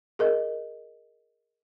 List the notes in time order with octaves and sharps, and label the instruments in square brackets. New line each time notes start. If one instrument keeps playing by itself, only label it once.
[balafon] G#4 A#4 D#5